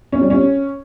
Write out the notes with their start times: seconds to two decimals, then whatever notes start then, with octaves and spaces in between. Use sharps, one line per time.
0.12 C#4
0.21 G3
0.30 C#4